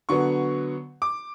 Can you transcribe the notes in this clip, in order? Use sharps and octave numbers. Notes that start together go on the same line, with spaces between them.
D3 F#3 B3 C#6
D6